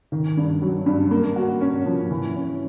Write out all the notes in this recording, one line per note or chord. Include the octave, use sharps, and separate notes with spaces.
D#3
G2
F#3
G2
A#3
F#4
C#4
F3
E3
C#4